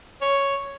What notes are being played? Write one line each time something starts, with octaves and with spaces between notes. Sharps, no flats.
C#5